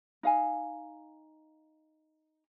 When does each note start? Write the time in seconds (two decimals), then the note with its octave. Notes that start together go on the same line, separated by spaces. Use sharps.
0.23 D#4 F5 G#5